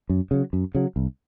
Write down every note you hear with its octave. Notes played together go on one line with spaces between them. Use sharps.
F#2
C#3 F#3
F#2
C#3 F#3
C2